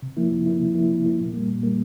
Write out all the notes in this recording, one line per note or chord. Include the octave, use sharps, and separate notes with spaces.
C3
F3 A#3 E4
C3
F3 A#3 E4
C3
F3 A#3 E4
C3
F3 A#3 E4
A#2
G3 A#3
A#2
G3 A#3